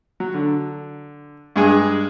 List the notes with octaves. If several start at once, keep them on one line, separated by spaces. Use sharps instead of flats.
F#3
D3
G2 G#3 G#4